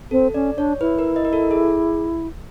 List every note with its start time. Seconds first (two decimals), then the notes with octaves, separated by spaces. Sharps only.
0.11 C4 A4
0.34 C#4 D5
0.57 D4 C#5
0.81 E4 B4
0.99 A#4
1.16 D#5
1.25 A#4
1.33 A4
1.51 G#4